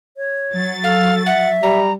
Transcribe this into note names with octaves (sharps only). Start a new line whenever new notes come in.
C#5
F#3 A6
A4 F5
E5 F#5
G3 A#5